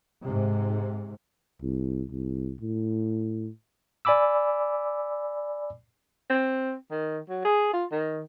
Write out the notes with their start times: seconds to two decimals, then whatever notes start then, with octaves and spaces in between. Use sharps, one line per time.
0.21 G#2 C3
1.62 C2
2.10 C2
2.61 A2
4.05 D5 G#5 B5 D6 E6
6.30 C4
6.91 D#3
7.29 F#3
7.44 G#4
7.73 F4
7.92 D#3